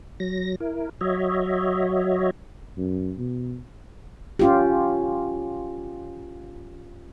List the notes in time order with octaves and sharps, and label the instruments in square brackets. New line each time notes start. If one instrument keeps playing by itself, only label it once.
[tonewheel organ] F#3 A#6
E4 A#4
F#3 F#4 C#5 D#5 E5
[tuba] F#2
B2
[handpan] C#4 F4 G4